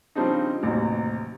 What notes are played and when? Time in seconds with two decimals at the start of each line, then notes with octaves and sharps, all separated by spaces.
0.15 C#3 F3 G3 C4 D4 D#4
0.63 A1 D#2 C3 F#3